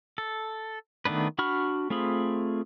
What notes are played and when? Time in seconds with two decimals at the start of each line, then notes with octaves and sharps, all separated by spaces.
0.18 A4
1.05 D#3 A3 B3 D4 B4
1.38 D4 F#4 B5 C#6 F6
1.90 A3 C4 F4 G#4 B5